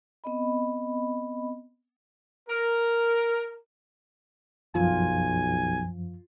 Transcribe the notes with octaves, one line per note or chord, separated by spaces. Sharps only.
B3 C4 D#5 B5
A#4
B1 F#2 F3 F4 G#5